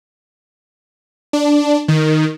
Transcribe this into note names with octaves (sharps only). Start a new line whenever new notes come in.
D4
D#3